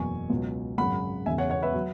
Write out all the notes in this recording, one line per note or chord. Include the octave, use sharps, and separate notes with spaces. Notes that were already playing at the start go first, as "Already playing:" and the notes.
Already playing: F#1 E2 B2 F#3 G#5 C#6
C#2 B2 F#3
G#1 F#2 C#3 F#5 B5
E1 E2 C#3 E5 G#5
C#5 F#5
C#5 F#5
B4 E5
F#3